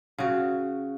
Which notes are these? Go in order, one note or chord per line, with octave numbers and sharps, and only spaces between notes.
C#3 F#4